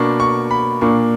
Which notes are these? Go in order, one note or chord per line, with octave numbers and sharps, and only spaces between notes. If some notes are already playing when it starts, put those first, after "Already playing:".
Already playing: B2 A#3 D4 C#6
C#6
B5
A#2 A#3 D4 C#6